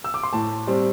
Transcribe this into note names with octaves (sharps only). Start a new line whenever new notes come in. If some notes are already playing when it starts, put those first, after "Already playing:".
E6
D6
C6
A2 A5
G3 C4